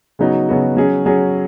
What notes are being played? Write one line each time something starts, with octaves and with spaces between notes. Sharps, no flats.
C#3 F#3 B3 D#4 F#4
C#3 F#3 B3 D#4 F#4
F#3 C#4 G#4
F#3 C#4 G#4